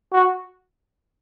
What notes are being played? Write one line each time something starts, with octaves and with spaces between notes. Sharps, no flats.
F#4